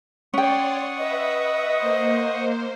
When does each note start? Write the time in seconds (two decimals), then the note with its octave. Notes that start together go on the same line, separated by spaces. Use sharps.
0.34 C#4 C#5 D5 F#5 G5 C6 C#6 D#6
0.98 B4 D#5 E5
1.77 A#3 C5